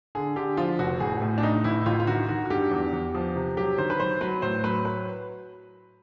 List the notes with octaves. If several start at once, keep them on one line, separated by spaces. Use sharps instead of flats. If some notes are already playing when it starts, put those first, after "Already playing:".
D3 G#4
D3 G4
F3 F4
F1 F#4
A1 G#4
A2
D4
A2 D#4
A1 E4
A1 F4
F4
D#3 F#4
D#3 F#4
F#4
G2 G4
E2
E2
F3
C3
F#3 G4
D#3 C5
B4
F#3 C5
F#3 B4
A2 C5
F#3 B4
B4